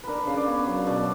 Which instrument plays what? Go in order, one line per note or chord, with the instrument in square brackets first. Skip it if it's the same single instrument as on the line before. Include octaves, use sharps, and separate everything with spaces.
[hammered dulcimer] D4 A#4 B4
B4
C#3 F5
D5
B3 C#5
F#3
B2 D5